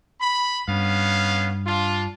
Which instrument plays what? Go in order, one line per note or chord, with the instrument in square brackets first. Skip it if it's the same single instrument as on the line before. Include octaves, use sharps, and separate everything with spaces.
[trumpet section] B5
[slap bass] G2 [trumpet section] B3 C#4 F5
[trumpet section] D4 F4